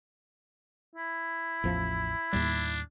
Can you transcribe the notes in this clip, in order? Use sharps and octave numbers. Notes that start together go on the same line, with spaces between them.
E4
A1 E2 F3
D#2 A2 G3 D4